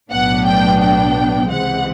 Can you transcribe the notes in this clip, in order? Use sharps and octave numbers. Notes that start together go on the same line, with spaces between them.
B1 A2 F#3 B3 D4 F#5
G5
G5
C#2 C3 E3 G#3 C4 F#5